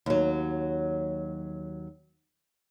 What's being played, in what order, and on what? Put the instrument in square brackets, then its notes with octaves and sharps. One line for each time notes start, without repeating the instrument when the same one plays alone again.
[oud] D#2 F#3